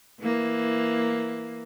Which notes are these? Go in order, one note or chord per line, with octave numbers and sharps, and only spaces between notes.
E3 A#3